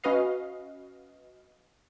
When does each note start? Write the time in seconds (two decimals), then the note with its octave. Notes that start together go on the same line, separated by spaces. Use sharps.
0.04 C#4 F#4 B4 D#5 F5